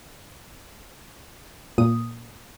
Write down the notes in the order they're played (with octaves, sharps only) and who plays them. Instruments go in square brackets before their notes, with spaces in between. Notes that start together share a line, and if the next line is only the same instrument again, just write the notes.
[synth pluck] A#2 D#6